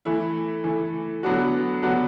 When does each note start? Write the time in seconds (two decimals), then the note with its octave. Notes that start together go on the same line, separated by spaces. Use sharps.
0.05 E3 A3 E4
0.64 E3 A3 E4
1.23 D3 F#3 B3 D4 F#4
1.82 D3 F#3 B3 D4 F#4